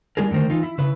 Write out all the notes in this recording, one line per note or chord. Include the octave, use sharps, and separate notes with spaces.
G3 D4 E4 G#4 A#4
D3 D#3 A3 A#4 C5
E3 D#4 F4
E4
C#3 E4 B4